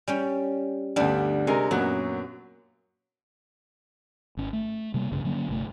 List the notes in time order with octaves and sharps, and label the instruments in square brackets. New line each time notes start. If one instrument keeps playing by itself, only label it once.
[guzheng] G3 C#4 G5
[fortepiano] D2 G2 [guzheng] G3 B3 D4
[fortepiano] C3 G#3 A#4 [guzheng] G#5
[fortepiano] F#2 A#2 F#3 [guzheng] B3 F#4
[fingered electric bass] G#1 C#4
A3
C3 G3 A#3
B1 G2 C#3
D3 F#3 A#3 C#4
G1 C3 A3